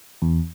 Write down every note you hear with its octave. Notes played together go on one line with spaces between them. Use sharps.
E2